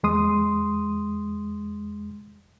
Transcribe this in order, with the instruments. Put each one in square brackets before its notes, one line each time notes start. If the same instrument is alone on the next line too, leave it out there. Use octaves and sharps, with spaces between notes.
[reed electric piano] E2 G#3 C6 D#6